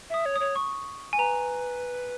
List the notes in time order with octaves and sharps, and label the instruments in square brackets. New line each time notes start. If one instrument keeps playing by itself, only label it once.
[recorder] E5 [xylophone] D#6
[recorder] C#5
[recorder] C#5 [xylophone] D#6
[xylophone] C#6
G#5
[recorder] B4 [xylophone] A#5